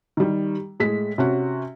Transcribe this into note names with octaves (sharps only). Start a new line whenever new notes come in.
D#3 G3
A2 G#3 B6
C3 C#4 F#4